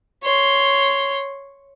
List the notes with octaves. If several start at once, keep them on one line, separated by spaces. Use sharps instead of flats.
C#5 C6